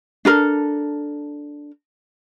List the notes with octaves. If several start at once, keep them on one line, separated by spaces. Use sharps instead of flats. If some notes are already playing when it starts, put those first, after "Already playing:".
D4 A4 A#4